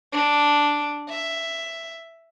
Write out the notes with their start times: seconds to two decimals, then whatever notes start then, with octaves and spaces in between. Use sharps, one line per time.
0.12 D4
1.09 E5